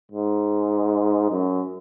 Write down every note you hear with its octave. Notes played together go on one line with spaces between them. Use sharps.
G#2
F#2